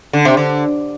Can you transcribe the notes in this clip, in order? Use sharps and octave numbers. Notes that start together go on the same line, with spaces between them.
D3
C3
D3